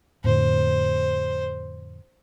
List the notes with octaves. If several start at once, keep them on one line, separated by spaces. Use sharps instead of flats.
F2 A2 D3 C5